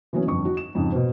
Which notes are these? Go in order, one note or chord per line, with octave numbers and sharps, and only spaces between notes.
E3 F#3 B3 C#4
G1 F2 C#6
F#4
E7
F2 G#2 C#3
B2 C5